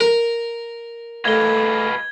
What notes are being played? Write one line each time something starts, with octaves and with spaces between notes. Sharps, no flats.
A#4
A3 B4 D#5 F5 G#6 G7